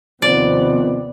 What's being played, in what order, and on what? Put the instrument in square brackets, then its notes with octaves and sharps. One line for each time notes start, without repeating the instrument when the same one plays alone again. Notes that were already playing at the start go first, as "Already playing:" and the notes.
[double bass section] D#2 C3 B3 [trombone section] D#3 F3 C4 [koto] D5